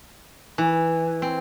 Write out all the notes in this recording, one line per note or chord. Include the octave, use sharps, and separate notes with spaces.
E3
C4